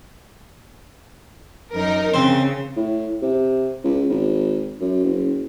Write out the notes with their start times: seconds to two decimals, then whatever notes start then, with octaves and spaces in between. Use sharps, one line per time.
1.74 F#2 D#4 A#4
2.14 C#3 C4 C5
2.76 A2
3.22 C3
3.84 C#2
4.09 G#1
4.81 F#2
5.04 F#1